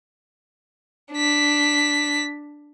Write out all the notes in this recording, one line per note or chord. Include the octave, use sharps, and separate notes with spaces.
D4 B6